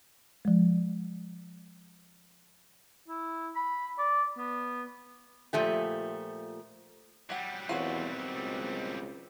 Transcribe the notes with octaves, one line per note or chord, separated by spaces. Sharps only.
F3 G#3
E4
B5
D5
B3
A#2 F3 A3 G4
F#3 G3 G4 F#5
E2 B2 D#3 C4 F4 F#4 C#5
C#2